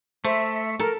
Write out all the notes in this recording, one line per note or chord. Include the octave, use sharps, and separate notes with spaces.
A3 C5 E5
A4 A#4 A#5